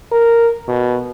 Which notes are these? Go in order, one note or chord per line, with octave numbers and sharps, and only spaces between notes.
A#4
B2